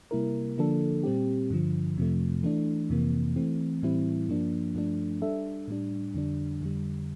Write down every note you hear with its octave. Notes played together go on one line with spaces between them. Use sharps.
C3 G3 A#3 E4 A#4
D3 F3 A#3 D4 A4
A#2 G3 C4 G4
G2 D3 F3
F2 C3 F3 A3
E3 A3 D4
F2 C3 E3 A#3
E3 A3 C4
A2 E3 G3 C4 E4
G2 F3 A#3 D4
G2 F3 A3 D4
G3 D4 A4 E5
A2 G3 D4
F2 D3 G3 D4
F2 D3 G3